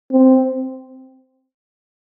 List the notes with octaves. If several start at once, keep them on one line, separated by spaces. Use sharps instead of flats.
C4